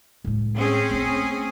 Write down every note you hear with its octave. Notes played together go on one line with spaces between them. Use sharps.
A2 G#3
C4 C#4 G#4
A3 B3